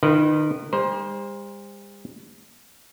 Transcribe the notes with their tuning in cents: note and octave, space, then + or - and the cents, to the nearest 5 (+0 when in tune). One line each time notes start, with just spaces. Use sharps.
D#3 -30 E4 +25 B4 +0
G3 +45 C5 +0 A#5 +40